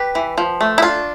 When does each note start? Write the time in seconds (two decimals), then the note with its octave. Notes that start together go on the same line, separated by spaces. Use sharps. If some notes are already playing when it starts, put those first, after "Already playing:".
Already playing: G4 B4
0.15 E3
0.38 F3
0.61 A3
0.78 E4
0.82 D4 F4